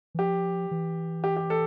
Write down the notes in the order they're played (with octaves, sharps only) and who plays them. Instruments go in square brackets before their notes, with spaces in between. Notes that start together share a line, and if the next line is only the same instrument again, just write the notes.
[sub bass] E3
[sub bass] F3 [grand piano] G4
[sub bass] E3
[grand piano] G4
G4
A4